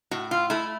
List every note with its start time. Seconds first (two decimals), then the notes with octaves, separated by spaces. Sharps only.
0.11 A2 F#4
0.31 F4
0.50 A3 E4